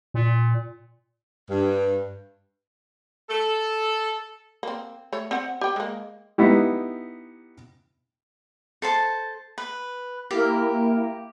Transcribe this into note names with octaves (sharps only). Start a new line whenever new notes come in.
A#2
G2
A4
A#3 C4
A3 C#5
C4 F#5
G4 G5
G#3 A#3
B3 D#4 E4 G4
A4 C5 A5
B4
A#3 E4 G4 A#4